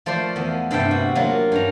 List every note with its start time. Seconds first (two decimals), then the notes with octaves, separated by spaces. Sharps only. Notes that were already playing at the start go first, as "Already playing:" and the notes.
0.06 F3 A3 C5 D5 C6
0.36 E2 B3
0.71 G2 C3 B4 E5 G5 A5
0.91 F#4
1.15 F#3 A#3 F4
1.52 G2 C#4 A#5